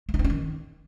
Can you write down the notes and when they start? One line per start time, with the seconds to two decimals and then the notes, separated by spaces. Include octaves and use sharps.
0.09 A3
0.14 D#4
0.19 C4
0.25 C#4
0.30 D#3